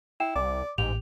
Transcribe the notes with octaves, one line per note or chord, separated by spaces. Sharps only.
E4 G5 E7
C2 D5 D6
A1 G#2 G4 F7